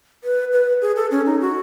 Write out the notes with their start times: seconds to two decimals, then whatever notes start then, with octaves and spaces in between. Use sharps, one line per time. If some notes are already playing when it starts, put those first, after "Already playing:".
0.24 B4
0.53 B4
0.82 G#4
0.96 A4
1.11 C#4
1.26 D#4
1.41 F#4